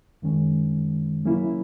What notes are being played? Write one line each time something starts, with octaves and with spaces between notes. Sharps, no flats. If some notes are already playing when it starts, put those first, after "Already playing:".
F#2 D#3 G#3 C#4
C#3 F#3 A#3 C#4 E4